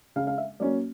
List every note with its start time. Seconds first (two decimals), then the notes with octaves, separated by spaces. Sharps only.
0.16 C#3 F5
0.27 F5
0.38 E5
0.60 F#3 A#3 C#4 D5